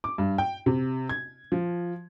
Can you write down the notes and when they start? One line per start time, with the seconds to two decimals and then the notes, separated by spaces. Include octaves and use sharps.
0.04 D6
0.18 G2
0.38 G5
0.66 C3
1.09 G#6
1.52 F3